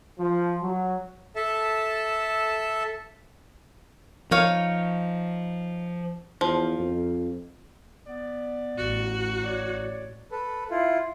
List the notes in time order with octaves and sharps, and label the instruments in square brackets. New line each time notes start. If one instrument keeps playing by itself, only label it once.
[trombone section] F3
F#3
[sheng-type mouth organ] A4 E5 A5
[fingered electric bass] F3 [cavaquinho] D#4 C#5 F5
[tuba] E2 [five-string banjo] F3
[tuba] F2
[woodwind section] B3 D5
[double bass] A1 [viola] F#4
[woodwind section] C#5 D5
[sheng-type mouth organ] A4 B4
E4 F4